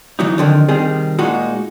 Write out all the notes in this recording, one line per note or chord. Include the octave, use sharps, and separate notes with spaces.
E3 F#3 D#4
F2 D3 D#3
C3 D#3 G3 G#4
A#2 G#3 D#4 F#4